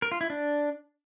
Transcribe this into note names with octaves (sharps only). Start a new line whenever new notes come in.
A#4
F4
E4
D4